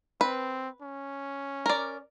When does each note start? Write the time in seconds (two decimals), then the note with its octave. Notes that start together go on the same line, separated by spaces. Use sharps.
0.21 C4 B4
0.82 C#4
1.66 A#4 D5